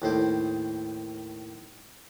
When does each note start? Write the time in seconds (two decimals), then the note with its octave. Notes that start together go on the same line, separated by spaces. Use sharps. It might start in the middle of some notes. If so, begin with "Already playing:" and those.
0.02 D#2 A2 C5 D6